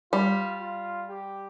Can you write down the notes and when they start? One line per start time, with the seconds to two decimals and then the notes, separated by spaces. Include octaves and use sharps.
0.12 G3 F4
0.61 F4
1.10 G4